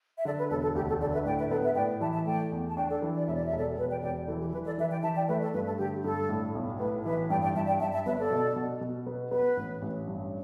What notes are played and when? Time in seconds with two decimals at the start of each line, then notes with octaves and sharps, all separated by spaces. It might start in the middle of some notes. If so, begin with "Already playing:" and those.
0.17 E5
0.24 D3 A4 D5
0.38 B4
0.50 E1 A4
0.63 A4
0.75 D2 G4
0.88 A4
1.00 D3 A4 D5
1.13 B4 E5
1.25 A2 D5 G5
1.38 B4 E5
1.50 B3 A4 D5
1.63 B4 E5
1.76 A2 D5 G5
2.01 E3 E5 A5
2.13 E5 A5
2.26 A3 D5 G5
2.52 E2
2.69 A5
2.77 D4 D5 G5
2.90 A4 D5
3.02 E3
3.15 D5
3.26 E1 E5
3.36 D5
3.46 E5
3.53 E1 A4 D5
3.78 E1 B4
3.90 D5 G5
4.02 E1 D5 G5
4.28 E3 A4
4.40 G4
4.53 E3 B4
4.65 A4 D5
4.78 E3 B4 E5
4.91 D5 G5
5.03 E3 E5 A5
5.16 D5 G5
5.28 A3 B4 E5
5.42 A4 D5
5.53 G2 B4
5.66 A4
5.78 D3 G4
6.04 G2 A4
6.29 A2
6.55 B1
6.80 A2 B4
7.05 E3 B4 E5
7.30 G2 D5 G5
7.43 D5 G5
7.55 G2 E5 A5
7.67 D5 G5
7.80 G2 E5 A5
7.93 E5 A5
8.06 G1 B4 E5
8.18 A4 D5
8.31 B2
8.56 B2
8.81 B2
9.07 B3
9.31 B3 B4
9.57 A1
9.82 A1
10.07 G2